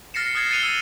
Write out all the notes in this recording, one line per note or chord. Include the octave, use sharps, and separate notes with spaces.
F6 A6 A#6 C7 C#7 E7
D#6 F6 F#6 G#6 A6 C7
A6 C#7 D#7 F7 G7
E6